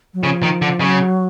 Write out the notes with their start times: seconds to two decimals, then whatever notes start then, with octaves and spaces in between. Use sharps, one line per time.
0.14 F#3
0.22 C#3 F3
0.43 D#3
0.62 D3
0.80 C#3 F#3